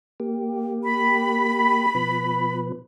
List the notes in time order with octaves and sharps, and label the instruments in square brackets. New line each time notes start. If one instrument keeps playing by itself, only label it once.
[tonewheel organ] A#3 G4
[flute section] B5
[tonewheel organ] B2 F3 B4